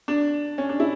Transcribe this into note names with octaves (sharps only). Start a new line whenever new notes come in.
D4
C#4
D4
E4